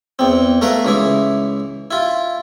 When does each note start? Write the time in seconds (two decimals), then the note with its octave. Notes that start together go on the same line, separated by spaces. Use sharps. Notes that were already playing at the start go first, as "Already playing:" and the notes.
0.19 E2 C4
0.62 A3 A#4 B4 F5
0.85 C#2 E3 E4
1.91 E4 F4